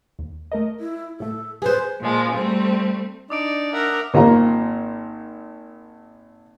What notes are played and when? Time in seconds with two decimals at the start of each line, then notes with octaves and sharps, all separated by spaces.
0.19 D#2
0.52 A3 A#4 D#5
0.80 E4
1.20 A2 A3 A4
1.62 G#4 B4 C5
2.00 A#2 F3 G#3
2.32 G3 A3 C4
3.30 D4 D#4 D5 D6 D#6 D7
3.73 A#4 E5 F#5
4.14 G#1 A#3 F4 A#5